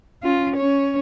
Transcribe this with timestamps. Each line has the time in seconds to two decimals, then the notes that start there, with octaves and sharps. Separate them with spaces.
0.23 C#4 F4
0.57 C#4 C#5